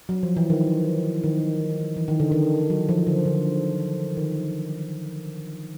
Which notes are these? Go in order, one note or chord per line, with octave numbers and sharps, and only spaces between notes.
F#3
F3
E3
D#3
D#3
E3
D#3
D3
D#3
F#3
F3
D3
D3
D#3